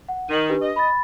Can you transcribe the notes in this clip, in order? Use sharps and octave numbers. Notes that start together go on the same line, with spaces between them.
F#5
D#3 D#7 F#7
D4 G4 B4
D#5
B5 A6